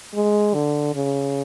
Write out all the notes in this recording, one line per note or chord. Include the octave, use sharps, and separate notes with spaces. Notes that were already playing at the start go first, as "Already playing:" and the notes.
G#3
D3
C#3